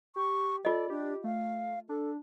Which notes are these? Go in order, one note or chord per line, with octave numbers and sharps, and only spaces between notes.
G4 C#6
F4 A4 D5 D#5
D4 G4
A3 F5
D4 A4